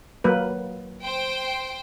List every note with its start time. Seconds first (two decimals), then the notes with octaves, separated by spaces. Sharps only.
0.24 F#3 A#3 B4
1.02 C5 G5